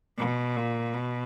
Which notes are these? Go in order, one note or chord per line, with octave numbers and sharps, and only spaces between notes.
B2
A#2
B2